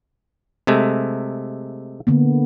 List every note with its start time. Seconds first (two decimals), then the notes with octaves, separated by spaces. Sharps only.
0.67 C3 G#3 A3
2.07 D3 A#3 B3